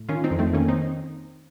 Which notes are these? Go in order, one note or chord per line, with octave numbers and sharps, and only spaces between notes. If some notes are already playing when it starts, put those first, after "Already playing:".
Already playing: A2
D#3 C#4 F4
C4 D#4
F2
A3 C4
D#3 A#3 C#4
C4 D#4